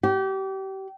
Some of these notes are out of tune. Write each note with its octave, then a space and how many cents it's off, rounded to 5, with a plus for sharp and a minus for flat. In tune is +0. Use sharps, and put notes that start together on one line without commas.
G4 -30